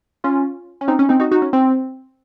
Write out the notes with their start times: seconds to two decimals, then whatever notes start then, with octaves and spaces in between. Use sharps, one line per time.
0.24 C#4 F4
0.81 C#4
0.88 C4 D#4
0.99 C#4
1.09 C4 D#4
1.20 D#4 F#4
1.31 D#4 F#4
1.42 C#4
1.53 C4